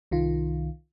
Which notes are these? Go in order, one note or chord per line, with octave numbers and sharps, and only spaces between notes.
C2 D#3 F4